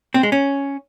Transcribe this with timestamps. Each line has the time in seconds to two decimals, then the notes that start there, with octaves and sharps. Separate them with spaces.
0.14 C4
0.23 G#3
0.32 C#4